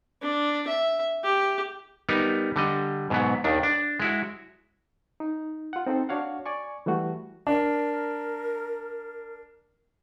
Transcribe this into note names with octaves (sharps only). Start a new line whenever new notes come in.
D4
E5
G4
G3 B3 D#4 A#4
D3 G3 D#5
G#2 B2 F#3 B3
D#2 D#3 D4
D4
G#3 E4 F#4
D#4
F4 F#5
C4 D#4 A4 C5
D4 F#4 C#5 F5 F#5
D5 G#5 C#6
E3 G3 A3 F#4
D4 A#4